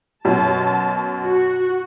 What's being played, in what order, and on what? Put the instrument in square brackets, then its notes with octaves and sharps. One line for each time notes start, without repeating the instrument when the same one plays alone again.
[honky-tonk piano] F#2 B2 [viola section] A5
[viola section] F#4